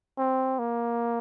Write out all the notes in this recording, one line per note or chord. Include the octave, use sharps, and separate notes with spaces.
C4
A#3